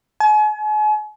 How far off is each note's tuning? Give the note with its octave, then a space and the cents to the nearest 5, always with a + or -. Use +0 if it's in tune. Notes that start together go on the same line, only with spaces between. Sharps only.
G#5 +40